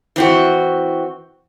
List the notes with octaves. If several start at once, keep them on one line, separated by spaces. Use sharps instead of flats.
E3 C4 F#4